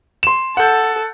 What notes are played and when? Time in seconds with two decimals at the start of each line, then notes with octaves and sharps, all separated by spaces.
0.23 C6 E7
0.57 A4 F#5 G6